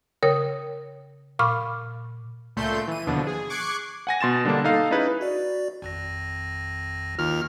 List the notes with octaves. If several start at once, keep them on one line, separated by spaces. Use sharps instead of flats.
C#3 A#4 C#5 G5 D#6
A#2 F5 B5 C#6 D6 F6
C#2 A#2 A3 C6 G6
E3 D#7
D#2 B2 D3 F3 D4
G#4
C#6 D6 F#6 G#6 C7
F#5 G#5 A#6
B2 C6 A6 E7
D3 G3 A#3 D4
D#4 A4 F5
C#4 D#4 E4 G#4 B4
F#4 D5
G#1 F2 A#6
D#2 F4 F6